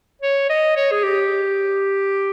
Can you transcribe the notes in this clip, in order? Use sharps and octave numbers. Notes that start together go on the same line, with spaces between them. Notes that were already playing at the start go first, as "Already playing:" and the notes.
C#5
D#5
C#5
G#4
G4